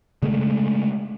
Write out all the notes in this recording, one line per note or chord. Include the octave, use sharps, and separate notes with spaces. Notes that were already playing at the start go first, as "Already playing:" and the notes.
C#3 G#3 A3